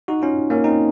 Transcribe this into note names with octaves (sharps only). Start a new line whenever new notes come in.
D#4 F#4
C#4 F4
A#3 C#4
C4 D#4